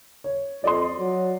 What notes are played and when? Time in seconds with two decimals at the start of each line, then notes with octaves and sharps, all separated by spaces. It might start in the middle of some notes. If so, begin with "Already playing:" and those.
0.24 C#5
0.64 F2 D5 D#5 C6
0.99 F#3